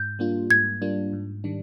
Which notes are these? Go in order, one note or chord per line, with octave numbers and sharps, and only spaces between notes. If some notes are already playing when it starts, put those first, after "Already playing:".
Already playing: G#2 G6
G3 A#3 D4 F4
G#2 G#6
G3 A#3 D4 F4
G#2
D#3 G3 D4